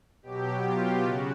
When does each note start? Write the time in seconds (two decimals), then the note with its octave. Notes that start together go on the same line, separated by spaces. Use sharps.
0.23 B2 F#3 G4
0.63 F4
1.03 C#3 F#4